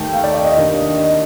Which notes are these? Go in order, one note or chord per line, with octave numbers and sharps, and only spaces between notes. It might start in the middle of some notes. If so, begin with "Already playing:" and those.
Already playing: D#2 D#3 A3 G5
F5
D5
D5
D#5
D#2 D#3 A#3 D4
D#5